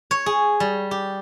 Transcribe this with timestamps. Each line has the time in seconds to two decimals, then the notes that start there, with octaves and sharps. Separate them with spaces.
0.11 C#5
0.26 G#4
0.60 G3
0.91 G4